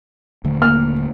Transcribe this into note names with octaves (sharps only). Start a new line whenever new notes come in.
D#1 D3 A3
A#3 F6